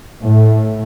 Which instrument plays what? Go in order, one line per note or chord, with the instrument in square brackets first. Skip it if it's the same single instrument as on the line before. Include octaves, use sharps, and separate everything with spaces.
[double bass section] A2